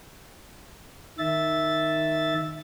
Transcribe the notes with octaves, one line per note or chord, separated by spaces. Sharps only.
D#3 E5 A6